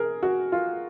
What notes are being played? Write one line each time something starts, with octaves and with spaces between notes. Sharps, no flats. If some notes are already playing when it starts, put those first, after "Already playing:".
Already playing: G#4 A#4
F#4
F4